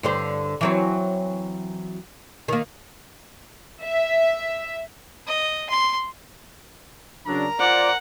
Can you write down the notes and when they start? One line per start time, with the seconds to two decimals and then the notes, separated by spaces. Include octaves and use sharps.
0.03 G2 D3 C5
0.61 E3 F#3 C4
2.48 D#3 A#3
3.84 E5
5.27 D#5
5.69 C6
7.27 C#3 F#3 D4 A#4 A#5
7.60 F4 C5 D5 F#5